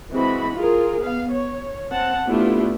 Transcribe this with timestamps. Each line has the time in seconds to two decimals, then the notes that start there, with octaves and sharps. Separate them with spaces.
0.12 E3 G#3 C4 F#4 B5
0.57 F4 G#4 A#4
1.02 B3 F5
1.32 C#5
1.92 C4 F#5 A5
2.27 A3 B3 D4 E4 F4 G4